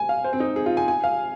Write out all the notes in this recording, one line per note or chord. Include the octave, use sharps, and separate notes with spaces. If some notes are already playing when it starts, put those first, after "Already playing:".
Already playing: G#5
F5
C5
C4
D#4
G#4
F4
G#5
G#5
F5